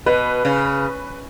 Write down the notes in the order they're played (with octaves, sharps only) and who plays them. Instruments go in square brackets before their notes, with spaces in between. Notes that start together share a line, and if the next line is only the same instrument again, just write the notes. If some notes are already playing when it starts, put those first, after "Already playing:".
[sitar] B2 [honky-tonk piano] B4
[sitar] C#3